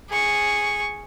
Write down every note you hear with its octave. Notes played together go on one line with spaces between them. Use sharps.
G#4 C#6